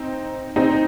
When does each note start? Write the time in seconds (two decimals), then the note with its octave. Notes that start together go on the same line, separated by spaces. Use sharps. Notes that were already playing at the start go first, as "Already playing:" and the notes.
Already playing: C4 D#4
0.56 C4 D#4